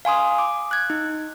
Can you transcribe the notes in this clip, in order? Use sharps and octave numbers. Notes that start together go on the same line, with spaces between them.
F5 G#5 C6 D#6
D6
F#6 G#6
D#4